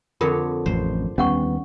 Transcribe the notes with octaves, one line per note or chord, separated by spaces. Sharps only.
F2 D3 F4 A#4 C#5
A1 F2 C5
D#2 G3 B3 C#4 F#5 C#6